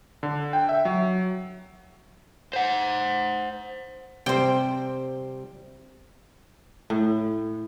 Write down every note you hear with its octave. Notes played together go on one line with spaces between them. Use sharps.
D3
G5
E5
F#3
C5 F#5
C3 G3 C4 C5 G5
A2